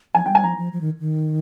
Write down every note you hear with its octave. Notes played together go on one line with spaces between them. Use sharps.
F3 G#5
F3 G3 G5
G#5
F3 A#5
F3
F3
D#3
D#3